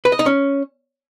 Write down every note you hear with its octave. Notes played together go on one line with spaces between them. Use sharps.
B4
D#5
D#4
C#4